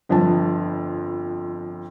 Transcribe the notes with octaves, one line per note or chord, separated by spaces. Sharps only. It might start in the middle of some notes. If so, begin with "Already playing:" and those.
G1 F2 A5